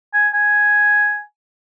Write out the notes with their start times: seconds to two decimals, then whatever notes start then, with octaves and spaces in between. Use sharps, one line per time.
0.13 G#5
0.33 G#5